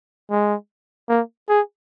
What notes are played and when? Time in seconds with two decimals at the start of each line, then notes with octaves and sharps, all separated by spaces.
0.31 G#3
1.09 A#3
1.49 G#4